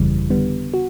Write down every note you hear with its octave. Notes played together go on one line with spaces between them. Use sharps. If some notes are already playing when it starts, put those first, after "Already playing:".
Already playing: G1 F2 C#3 E3 G3
D3 G3 B3
F#4